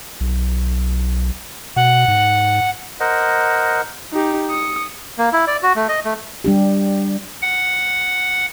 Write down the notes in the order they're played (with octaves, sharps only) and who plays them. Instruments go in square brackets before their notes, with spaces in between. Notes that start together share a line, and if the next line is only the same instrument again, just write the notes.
[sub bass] B1
[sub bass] B2 [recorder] F#5
[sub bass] G#2
[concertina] A#4 C5 D#5 F#5
[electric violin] D#4 G4
D#6 C#7
[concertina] A#3
E4
D5
F#4
A3
D#5
A3
[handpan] G3 D4 G4
[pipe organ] F#5